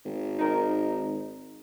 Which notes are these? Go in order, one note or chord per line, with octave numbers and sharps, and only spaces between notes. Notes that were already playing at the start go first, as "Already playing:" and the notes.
G#1
D#4 A#4